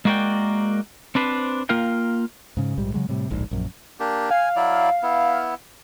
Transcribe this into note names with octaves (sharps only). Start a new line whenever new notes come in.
G#3 A#3 F#4 A#4 D5 G5
C4 D4 B4 C5
A#3 F4 A#4 F5 G5
G#2 C#3
A#1 G#2 G3
C#3 F#3 G#3
A2 C3 G3
D1 A#1 G#2
A#1 F#2
A#3 D4 G4
F5 G#5
F#3 E4 D5
B3 E4